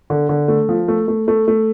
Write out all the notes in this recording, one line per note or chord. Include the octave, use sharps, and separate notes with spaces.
D3
D3
A3
F3
A3
A3
A3
A3